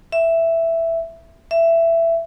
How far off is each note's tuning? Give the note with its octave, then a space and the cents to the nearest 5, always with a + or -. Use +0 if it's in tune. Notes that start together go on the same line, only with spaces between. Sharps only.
E5 +5
E5 +15